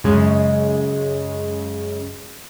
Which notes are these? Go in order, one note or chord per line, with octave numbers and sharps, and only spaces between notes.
F#2 C#3 G#3